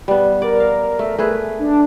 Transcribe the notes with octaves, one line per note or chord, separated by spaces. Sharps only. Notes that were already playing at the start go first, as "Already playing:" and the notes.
G3 B3
A#4 D5
F5
A3
A3 G#4 B4
D4